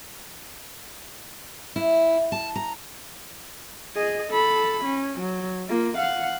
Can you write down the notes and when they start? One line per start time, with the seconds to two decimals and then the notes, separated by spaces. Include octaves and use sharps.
1.76 E4
2.32 A5
2.56 A#5
3.95 G#4 D#5
4.30 A4 B5
4.84 C#4
5.20 F#3
5.69 A#3 F4
5.98 F5 F#5